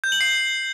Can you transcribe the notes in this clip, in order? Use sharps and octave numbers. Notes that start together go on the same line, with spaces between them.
G6
F#7
C7